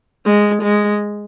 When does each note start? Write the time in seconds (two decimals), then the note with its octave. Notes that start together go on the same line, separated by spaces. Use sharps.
0.26 G#3
0.62 G#3